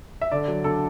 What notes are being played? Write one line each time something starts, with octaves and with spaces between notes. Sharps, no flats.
E5
D3 D5
F#3
D3 A4